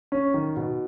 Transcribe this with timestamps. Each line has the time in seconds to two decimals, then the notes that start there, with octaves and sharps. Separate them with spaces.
0.12 C#4
0.34 D#3
0.56 B2